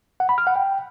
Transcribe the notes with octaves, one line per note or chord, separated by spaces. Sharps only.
F#5
B5
F6
F#5
G5